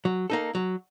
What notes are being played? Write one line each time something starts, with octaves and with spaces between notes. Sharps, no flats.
F#3
A#3 D#4 A4
F#3